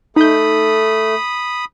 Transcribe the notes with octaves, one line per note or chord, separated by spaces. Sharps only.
A3 D#4 B5 D#6 G6